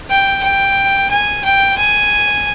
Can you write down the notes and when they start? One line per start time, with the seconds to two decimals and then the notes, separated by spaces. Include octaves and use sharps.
0.10 G5
0.43 G5
1.11 G#5
1.44 G5
1.77 G#5